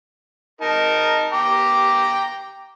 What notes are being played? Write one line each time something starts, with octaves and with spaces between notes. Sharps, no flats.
D#4 A#4 A5
G5 A#5 D6